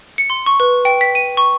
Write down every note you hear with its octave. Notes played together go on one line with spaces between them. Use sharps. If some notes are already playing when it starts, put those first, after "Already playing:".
C#7
C6
C#6
B4
G5
B6
D#7
C#6